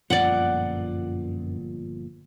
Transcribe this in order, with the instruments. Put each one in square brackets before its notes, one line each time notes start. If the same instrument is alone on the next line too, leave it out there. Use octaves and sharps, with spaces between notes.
[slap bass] G1 A#2 F3 [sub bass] F#2 [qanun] D5 F#5